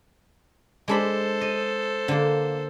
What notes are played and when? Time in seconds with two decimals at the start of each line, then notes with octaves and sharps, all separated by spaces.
0.88 G#3 D4 A4 C5 B5
1.41 D#5
2.08 D3 A#3